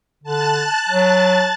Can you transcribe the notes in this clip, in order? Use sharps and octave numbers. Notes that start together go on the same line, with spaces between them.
D3 A5 F#6 A6
F#3